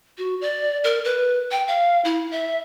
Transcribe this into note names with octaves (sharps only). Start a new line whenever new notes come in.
F#4
D5
A#4
B4
G5
F5
E4
E5